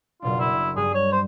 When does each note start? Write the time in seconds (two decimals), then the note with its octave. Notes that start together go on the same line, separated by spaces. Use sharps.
0.22 F#1 B2 D4 F4
0.40 E4 B5 C6
0.76 G2 G#4
0.94 C#5
1.12 C5